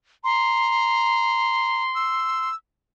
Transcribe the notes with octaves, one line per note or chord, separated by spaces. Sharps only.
A#5 C6
E6